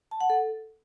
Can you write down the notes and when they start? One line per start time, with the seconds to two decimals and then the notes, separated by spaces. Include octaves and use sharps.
0.11 A5
0.21 F#5
0.30 A4